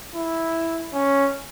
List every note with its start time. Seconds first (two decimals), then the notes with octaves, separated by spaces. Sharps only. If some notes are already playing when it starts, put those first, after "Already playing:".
0.15 E4
0.93 C#4